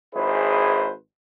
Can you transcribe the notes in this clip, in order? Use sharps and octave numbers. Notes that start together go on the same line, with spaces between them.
G#1 E4 G#4 B4 C5